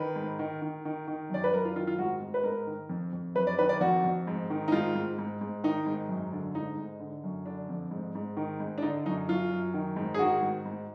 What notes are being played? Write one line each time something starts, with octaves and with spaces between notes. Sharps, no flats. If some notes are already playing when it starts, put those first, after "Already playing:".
Already playing: D#3 B4
G#2
D#3
D#3
D#3
D#3
F#2 D5
B4
F#2 A#4
F4
D#3 F4
F4
G#2 F#4
G#2
B4
G#2 A#4
D#3
F2
F2
F#2 B4
D5
D#3 B4
D5
F2 F#4
F2
G#2
D#3
D#4
G#2 F4
G#2
G#2
G#2
D#3 D#4
G#2
F#2
D3
G#2 D#4
G#2
D3
F#2
D3 D4
F2
G#2
G#2
D#3
G#2
D4
D3 D#4
F#2 D#4
F#2 F4
F#2
D#3
G#2
G#4
D#3 F#4
G#2
G#2